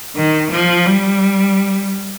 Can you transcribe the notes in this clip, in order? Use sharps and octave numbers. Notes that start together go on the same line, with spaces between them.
D#3
F3
G3